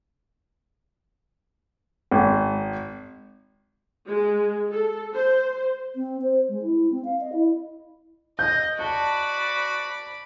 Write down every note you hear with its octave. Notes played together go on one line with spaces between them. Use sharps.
G#1
G#3
A4
C5
C4
C5
G#3
E4
C4
F5
D#5
E4
D#5 G6
F#4 D5 A5 B5